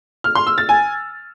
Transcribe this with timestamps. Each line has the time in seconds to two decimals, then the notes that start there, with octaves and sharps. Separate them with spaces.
0.24 F6
0.35 C6
0.47 E6
0.58 A6
0.69 G#5